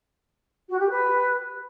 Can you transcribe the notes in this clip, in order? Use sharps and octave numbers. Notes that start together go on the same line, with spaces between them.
F#4
G4
B4